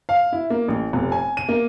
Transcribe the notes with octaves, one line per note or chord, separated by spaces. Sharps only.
F5
E4
A#3
A1
F1
G#5
D#7
A#3